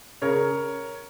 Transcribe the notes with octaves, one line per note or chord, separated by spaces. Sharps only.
C#3 A#4 C#5